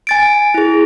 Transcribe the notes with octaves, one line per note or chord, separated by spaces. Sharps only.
G#5 A6 D7
E4 G#4